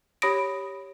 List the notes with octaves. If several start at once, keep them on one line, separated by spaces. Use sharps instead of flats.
G4 C#5 B5 D#6 A#6 D7